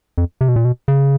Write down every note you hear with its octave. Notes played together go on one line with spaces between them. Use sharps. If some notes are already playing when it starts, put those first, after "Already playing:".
F2
C3
B2
A#2
B2
C#3